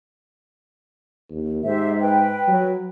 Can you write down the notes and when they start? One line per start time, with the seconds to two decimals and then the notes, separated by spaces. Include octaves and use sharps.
1.31 D#2
1.64 G#2 G4 C5 E5
2.00 B4 G5
2.47 F#3